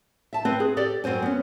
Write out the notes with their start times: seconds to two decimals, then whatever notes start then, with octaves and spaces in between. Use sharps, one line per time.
0.33 E5 A5
0.45 C4 B4
0.60 G#4
0.77 G4 A4 D5
1.04 F#2 C4 C5 G#5
1.22 B3 C#4